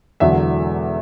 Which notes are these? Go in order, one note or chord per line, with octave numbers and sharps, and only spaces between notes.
E1 E2 D3 F#3 E5